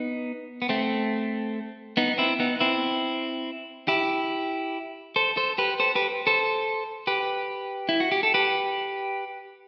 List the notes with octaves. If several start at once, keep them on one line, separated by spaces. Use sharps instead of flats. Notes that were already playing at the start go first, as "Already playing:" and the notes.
Already playing: B3 D#4
B3
A3 C4
B3 D#4
C4 E4
B3 D#4
C4 E4
E4 G4
A4 C5
A4 C5
G4 B4
A4 C5
G4 B4
A4 C5
G4 B4
E4
F#4
G4
A4
G4 B4